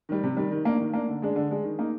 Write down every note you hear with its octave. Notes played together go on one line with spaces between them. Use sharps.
D#3 G3
C3
D#3 G3
D#3
A#3 D4
D#3
A#3 D4
D3
G#3 D4
D3
G#3 D4
D#3
A#3 D#4